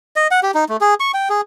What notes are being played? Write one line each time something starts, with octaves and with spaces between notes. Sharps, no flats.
D#5
F#5
G4
D#4
A3
G#4
C#6
G5
G#4